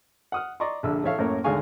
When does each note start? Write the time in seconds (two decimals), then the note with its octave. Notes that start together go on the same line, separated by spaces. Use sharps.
0.32 F#5 D#6 F6
0.60 D5 D#5 A#5 C6 C#6
0.83 A#1 D3 E5 E6
1.04 A1 A4 C#5 E5 F5
1.18 F#2 A2 A#3 A#4 C#5
1.44 G#1 D2 G#3 F5 G#5 C#6